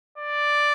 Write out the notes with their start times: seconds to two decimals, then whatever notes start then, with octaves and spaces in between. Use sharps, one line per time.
0.18 D5